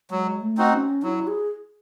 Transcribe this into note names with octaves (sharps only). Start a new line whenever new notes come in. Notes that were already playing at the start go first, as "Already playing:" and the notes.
F#3 G#3
A3
C4 D#4 F#4
C#4
F#3 E4
G#4